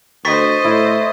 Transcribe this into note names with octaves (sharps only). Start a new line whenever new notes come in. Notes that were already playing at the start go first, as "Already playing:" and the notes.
D2 C5 D#5 C#6 A6 B6
A2 E4